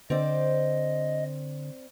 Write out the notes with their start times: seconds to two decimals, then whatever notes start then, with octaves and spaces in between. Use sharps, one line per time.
0.10 D3 C4 C5 D5 D#5